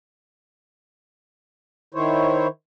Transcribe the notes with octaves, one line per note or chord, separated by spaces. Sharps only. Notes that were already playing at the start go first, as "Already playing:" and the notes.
D#3 E4 C5 C#5